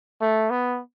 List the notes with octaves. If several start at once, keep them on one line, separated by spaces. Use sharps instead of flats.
A3
B3